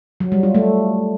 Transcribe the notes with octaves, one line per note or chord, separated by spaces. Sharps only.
F#3
G3
F4
A3